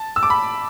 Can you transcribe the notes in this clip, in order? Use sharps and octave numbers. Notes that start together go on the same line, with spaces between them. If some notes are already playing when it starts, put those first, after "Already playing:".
Already playing: A5
E6
D6
B5